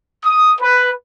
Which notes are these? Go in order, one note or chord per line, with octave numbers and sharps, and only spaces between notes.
D#6
B4